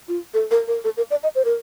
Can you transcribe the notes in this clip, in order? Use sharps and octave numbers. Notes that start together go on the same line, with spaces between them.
F4
A4
A#4
A#4
A4
A#4
D5
D#5
C5
A#4